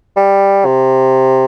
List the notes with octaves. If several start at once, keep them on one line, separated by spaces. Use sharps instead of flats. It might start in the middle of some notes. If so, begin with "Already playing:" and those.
G3
C3